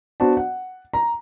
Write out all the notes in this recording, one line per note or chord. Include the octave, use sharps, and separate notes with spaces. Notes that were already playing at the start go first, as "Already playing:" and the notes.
B3 D4 F#4 C5 D5 A5
F#5
A#5